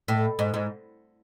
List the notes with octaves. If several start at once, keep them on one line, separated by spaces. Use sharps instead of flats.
A2
G#2
G#2